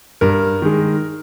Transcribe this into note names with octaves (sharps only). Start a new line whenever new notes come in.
G2 A#4
D#3 G#3